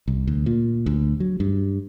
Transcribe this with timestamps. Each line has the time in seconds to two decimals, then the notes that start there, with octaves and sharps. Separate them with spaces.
0.08 C2
0.27 D2
0.46 A#2
0.86 D2
1.20 F#3
1.40 G2